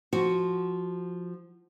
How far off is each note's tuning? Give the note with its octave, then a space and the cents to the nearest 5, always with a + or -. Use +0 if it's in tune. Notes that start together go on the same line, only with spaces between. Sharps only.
F3 +0 F#4 +0